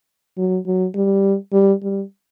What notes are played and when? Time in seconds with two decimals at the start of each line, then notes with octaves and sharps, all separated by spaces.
0.37 F#3
0.66 F#3
0.95 G3
1.53 G3
1.82 G3